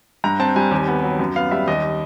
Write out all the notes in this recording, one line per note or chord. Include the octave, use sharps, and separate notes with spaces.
G2 A#5
C4 A5
G3 G#5
D#2
B3
F#3
F#2
B3 F5
G3 E5
D#2 D#5